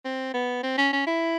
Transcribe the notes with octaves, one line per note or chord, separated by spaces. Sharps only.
C4
B3
C4
C#4
C#4
E4